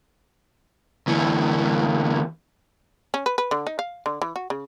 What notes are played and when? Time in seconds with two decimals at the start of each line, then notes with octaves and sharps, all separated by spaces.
1.07 D2 E3
3.14 C#4
3.26 B4
3.38 B4
3.51 D3
3.67 D#4
3.79 F5
4.06 D3
4.21 E3
4.36 F#4
4.50 C#3